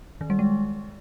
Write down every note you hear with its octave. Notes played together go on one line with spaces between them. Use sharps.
D#3
G3
G#3